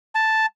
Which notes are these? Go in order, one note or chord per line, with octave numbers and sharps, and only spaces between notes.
A5